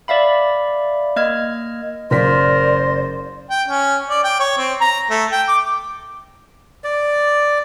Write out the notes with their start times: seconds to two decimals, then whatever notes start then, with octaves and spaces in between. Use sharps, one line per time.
0.08 D5 E5 F5 B5
1.16 A#3 D#5 F6 G#6
2.11 F#1 A#4 C5 D5 B6
3.50 G5
3.68 C#4
4.10 D5
4.24 G5
4.40 C#5
4.58 C4
4.81 A#5
5.10 A3
5.32 G5
5.48 D6
6.84 D5